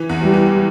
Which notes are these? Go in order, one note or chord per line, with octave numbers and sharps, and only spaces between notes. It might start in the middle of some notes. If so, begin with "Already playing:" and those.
Already playing: E3
E2
G3
E3